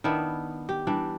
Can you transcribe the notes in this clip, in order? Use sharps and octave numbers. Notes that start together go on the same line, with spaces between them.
D#3 B3 D4 E4
G4
E3 G3 D4